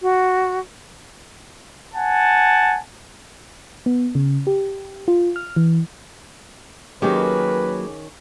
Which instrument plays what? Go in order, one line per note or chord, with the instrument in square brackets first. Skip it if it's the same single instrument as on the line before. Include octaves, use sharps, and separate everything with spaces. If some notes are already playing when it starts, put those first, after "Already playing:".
[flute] F#4
[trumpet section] F#5 G#5 A5
[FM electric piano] B3
C#3
G4
F4
F6
E3
[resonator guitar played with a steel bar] D#3 C#4 [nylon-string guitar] F#3 A#3 G4 [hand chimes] G#4 D6 [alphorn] B4